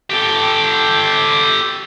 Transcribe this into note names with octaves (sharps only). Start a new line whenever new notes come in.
G4 A4